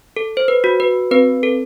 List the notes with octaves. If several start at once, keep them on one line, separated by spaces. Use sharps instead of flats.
A4
C5
B4
F#4
B4
C4 B4
A4